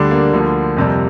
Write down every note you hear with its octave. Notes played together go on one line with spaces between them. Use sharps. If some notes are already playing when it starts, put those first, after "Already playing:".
Already playing: D2 D3 G3 D4
A#3
D2 D3 F3
F2 C3 G3